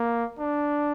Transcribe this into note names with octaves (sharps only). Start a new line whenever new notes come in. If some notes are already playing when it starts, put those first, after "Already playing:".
Already playing: A#3
D4